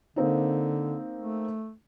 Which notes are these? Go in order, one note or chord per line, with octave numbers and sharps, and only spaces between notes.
D3 A#3 C4 D#4
A3